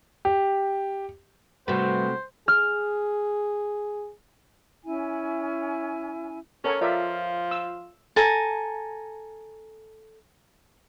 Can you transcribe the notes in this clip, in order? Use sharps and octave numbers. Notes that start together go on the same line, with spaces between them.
G4
C3 G3 A3 F#4 B4 C5
G#4 F6
C#4 E4 G#5
C#4 A4 A#4 C#5
F3 F4 A#4 D5 E5
E6
A4 G#5 A#5